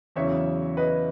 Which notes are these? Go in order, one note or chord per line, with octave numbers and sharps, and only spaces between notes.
E2 C#3 F#3 C#5 E5
B4 D#5